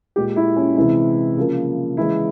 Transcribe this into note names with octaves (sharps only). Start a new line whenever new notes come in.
A#2 G#3 G4
E4
C#4
C3 E3 G#3 E4
C#3 F3 A#3
C#3 E3 G#3 E4